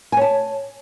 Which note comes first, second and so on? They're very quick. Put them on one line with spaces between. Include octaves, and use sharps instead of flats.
G#5 C#5 A5